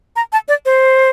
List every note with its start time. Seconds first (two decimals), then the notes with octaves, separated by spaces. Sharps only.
0.16 A#5
0.33 A5
0.48 D5
0.65 C5